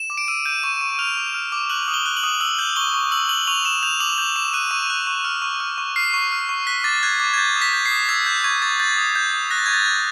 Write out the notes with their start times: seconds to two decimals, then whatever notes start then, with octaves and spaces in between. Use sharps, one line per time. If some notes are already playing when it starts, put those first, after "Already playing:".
Already playing: E7
0.10 D6
0.18 D7
0.28 E6 D#7
0.45 G6 D#7
0.63 C#6 D#7
0.81 C#6
0.99 F6 F7
1.17 D6
1.34 F6
1.52 D6
1.70 F#6 F#7
1.88 D#6
1.94 G7
2.06 F#6
2.17 F#7
2.23 D#6
2.40 E6 F#7
2.59 G6
2.76 C#6 G7
2.94 C#6
3.11 E6 F#7
3.29 G6 F#7
3.47 C#6 F7
3.65 C#6 E7
3.83 G6 F7
4.00 D6 F#7
4.18 G6 F7
4.36 D6 E7
4.53 F#6 D#7
4.71 C#6
4.90 F#6
5.07 C#6
5.25 F6
5.42 C#6
5.60 F6
5.78 C#6
5.96 F6 C7
6.14 C#6
6.32 F6
6.49 C#6
6.67 F#6 B6
6.84 D6 A6
7.03 F#6 G#6
7.20 D6
7.33 G#6
7.38 G6 A6
7.56 D#6
7.62 B6
7.73 G6
7.85 C7
7.91 D#6
8.09 E6 G#6
8.26 G6
8.44 C#6 G#6
8.62 C#6 A6
8.80 G6 A6
8.97 D#6
9.15 G6
9.33 D#6
9.51 F#6 A#6
9.58 A6
9.66 C#6 G#6
9.73 A6
9.86 F#6